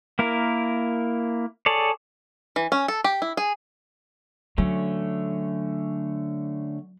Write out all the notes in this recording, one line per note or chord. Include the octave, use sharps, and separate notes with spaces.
A#3 E4 A#4
G#4 A4 C#5 D5
E3
C#4
A4
G4
E4
G#4
D3 F#3 A3 C#4